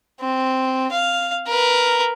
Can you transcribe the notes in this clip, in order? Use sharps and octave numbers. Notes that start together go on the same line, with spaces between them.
C4
F5
A#4 B4